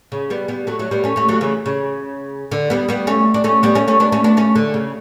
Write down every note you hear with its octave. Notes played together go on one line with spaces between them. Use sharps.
C#3
G3 B3
G3 B3
F#3 A3
F#3 A3
G3 B3
A3 C#4
A3 C#4
F#3 A3
C#3 E3
C#3
D3
G3 B3
G3 B3
A3 C#4
D4
A3 C#4
G3 B3
A3 C#4
A3 C#4
B3 D4
A3 C#4
B3 D4
A3 C#4
D3
C#3